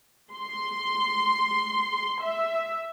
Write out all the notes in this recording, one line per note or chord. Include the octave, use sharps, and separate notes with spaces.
C6
E5